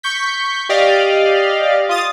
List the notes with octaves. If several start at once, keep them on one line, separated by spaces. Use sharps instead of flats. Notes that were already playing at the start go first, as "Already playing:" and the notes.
C#6 G6 B6
G4 D5 D#5 F5
F4 D#6 A6